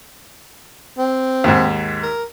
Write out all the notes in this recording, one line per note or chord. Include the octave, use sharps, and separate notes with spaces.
C4
D#2 G#2
A#4